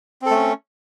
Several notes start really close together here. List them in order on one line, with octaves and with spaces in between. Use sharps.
C4 A4 A3 C#4